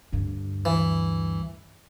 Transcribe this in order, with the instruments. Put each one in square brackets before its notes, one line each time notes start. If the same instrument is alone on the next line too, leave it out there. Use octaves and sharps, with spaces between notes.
[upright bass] D2 G2
[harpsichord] E3